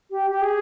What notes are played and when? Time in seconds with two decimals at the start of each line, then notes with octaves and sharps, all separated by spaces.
0.11 G4
0.31 G4
0.42 G#4